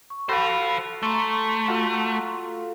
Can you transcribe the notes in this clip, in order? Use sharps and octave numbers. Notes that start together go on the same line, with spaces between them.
C#6
F#4 A4 C5 F5 B5
A3 A#5 C6 C#6
F4 F#4 A4